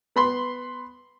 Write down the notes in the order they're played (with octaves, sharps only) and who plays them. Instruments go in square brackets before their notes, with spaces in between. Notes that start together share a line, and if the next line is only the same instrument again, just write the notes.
[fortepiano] B3 B5 C6